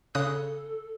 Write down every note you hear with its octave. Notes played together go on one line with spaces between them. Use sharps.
C#3 A4 D#6 F#6